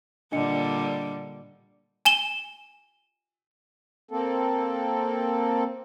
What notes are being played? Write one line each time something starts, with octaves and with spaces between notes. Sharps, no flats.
A#2 D3 G3 D4 D#5 C#7
G#5 E7 G7
A#3 C4 A4